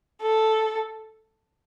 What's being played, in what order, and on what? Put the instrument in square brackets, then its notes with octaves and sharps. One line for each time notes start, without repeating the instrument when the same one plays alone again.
[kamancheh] A4